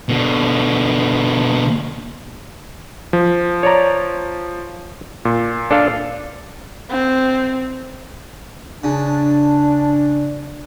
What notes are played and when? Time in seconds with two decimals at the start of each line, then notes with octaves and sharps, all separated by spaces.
0.09 B2 D3
3.13 F3
3.63 C#5 D5 A#5
5.25 A#2
5.71 D4 A4 F5
6.90 C4
8.84 C#3 D4